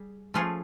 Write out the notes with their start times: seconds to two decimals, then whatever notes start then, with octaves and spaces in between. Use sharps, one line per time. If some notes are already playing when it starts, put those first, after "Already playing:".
Already playing: G3 G#4
0.34 F3 A3 C#4 F4 G#4